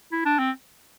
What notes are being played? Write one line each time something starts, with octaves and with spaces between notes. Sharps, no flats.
E4
D4
C4